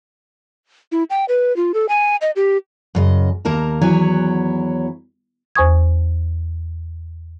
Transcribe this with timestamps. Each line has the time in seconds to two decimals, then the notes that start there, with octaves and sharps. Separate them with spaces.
0.92 E4
1.10 G5
1.29 B4
1.56 F4
1.74 A4
1.89 G#5
2.21 D#5
2.36 G4
2.95 F#2 C#3 D#5
3.45 D#2 A#3 A#4 A5 A#5
3.82 E2 F#3 E4 C#5 G#5
5.56 E2 C5 G#5 C#6 D#6 G#6